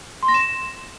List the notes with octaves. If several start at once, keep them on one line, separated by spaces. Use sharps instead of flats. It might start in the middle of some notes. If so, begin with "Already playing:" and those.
C6
A#6
E7